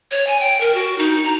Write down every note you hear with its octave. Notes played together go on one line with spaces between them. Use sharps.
C#5
G#5
G5
A#4
F#4
D#4
A#5